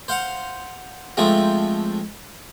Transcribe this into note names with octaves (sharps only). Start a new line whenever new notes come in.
C5 F5 F#5
F3 G#3 A3 C4